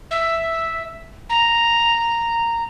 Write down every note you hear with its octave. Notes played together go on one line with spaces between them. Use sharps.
E5
A#5